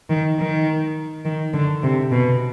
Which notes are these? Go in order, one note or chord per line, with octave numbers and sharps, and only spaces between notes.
D#3
D#3
D#3
D3
C3
B2